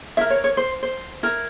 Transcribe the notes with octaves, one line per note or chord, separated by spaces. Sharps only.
E4 A#4 E5
C#5
C#5
C5
C5
E4 A#4